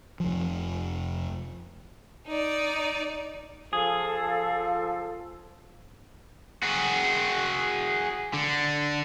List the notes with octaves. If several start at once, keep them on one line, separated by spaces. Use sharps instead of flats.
F1 F3
D#4 D5
F3 G#4 A4 F5
F#4 G#4
D3